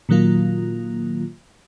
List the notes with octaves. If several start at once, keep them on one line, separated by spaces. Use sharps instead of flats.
A#2 D#3 F#3 A#3 F4